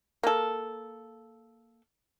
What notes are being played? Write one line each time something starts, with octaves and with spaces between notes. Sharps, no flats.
A#3 A4